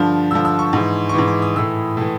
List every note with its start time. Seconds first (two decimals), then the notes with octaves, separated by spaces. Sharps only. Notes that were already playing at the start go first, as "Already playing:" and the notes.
Already playing: G2 D3 F3 F6
0.31 G2 D3 F3 E6
0.45 E6
0.59 C#6
0.73 G#2 E3
1.09 C#6
1.14 G#2 E3 D6
1.28 D6
1.42 D#6
1.55 A2 E3 E6
1.97 A2 E3